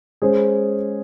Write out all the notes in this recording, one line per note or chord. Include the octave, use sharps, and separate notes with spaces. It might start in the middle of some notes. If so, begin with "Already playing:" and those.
G#3 C#4 G#4 C5